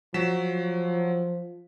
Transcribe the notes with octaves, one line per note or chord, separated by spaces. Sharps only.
F3 F#3 B6 E7